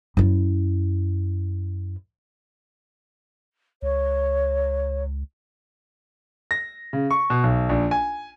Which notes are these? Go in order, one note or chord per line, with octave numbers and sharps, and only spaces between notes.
F#2 E4
C#2 C#5
A#6
C#3
C#6
B2
B1
A#1
G#5